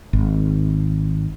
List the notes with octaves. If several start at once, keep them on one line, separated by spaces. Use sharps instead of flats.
G#1